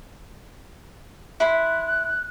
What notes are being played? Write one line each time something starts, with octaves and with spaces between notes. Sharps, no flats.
E4 B5 C6 F#6